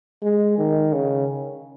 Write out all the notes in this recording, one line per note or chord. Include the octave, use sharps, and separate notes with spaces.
G#3
D#3
C#3